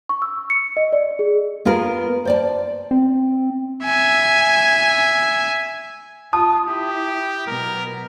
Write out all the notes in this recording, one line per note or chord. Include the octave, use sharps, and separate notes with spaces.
C#6
E6
C#7
D#5
D5
G#4
B3 F4 G#4 A#4
C5 D5 A5
C4
E5 G#5
F4 A5 D#6
E4 G4
B2 F#3 A#4